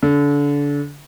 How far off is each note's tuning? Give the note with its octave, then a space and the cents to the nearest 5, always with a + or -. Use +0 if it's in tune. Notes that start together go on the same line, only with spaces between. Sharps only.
D3 -30